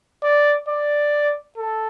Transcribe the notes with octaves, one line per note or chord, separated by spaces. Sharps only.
D5
D5
A4